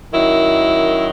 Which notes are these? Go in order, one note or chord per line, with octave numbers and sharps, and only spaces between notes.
F#2 D#3 F#3 E4